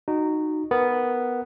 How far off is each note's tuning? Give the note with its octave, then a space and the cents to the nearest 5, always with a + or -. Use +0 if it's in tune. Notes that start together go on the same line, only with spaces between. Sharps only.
D#4 -15 F#4 +0
B3 +0 A#4 +0